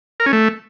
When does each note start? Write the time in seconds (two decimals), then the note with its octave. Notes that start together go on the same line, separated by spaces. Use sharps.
0.20 A#4
0.26 C#4
0.33 A3